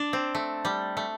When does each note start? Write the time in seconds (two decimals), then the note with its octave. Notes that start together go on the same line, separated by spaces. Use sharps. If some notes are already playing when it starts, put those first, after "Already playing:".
Already playing: D4
0.13 C4
0.35 A3
0.65 G3
0.97 A3